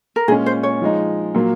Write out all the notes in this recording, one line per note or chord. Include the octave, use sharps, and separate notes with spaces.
A#4
A#2 G#3 C#4 G#4
C5
C#5
F3 G#3 D#4
A#2 F#3 A#3